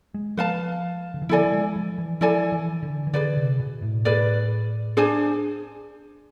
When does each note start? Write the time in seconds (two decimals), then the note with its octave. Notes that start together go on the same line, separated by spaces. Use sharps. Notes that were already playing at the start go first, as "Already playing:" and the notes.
0.14 G#3
0.37 F3 B4 F5 A5
1.14 D3
1.22 E3
1.29 F3 E4 A4 D5 G#5
1.45 F3
1.53 G#3
1.76 F3
1.98 E3
2.21 F3 E4 A4 D5 G#5
2.52 E3
2.83 D3
3.07 E3
3.13 D3 G#4 B4 D5
3.37 C3
3.60 B2
3.82 A2
4.05 A2 G#4 B4 D5
4.97 D4 G#4 C5 G#5